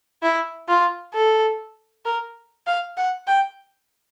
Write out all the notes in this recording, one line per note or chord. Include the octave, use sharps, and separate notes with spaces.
E4
F4
A4
A#4
F5
F#5
G5